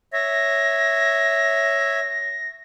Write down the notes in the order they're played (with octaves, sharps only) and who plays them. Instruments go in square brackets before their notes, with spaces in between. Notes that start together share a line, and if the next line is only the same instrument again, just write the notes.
[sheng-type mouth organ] C#5 E5 [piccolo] A#6